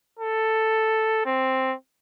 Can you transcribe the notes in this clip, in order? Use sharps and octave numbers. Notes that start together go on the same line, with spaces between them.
A4
C4